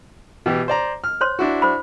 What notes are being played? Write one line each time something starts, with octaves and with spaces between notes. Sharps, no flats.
B2 E3 G4
C5 D5 A#5
F6
C5 C#5 C6
D4 E4 F#4
C5 B5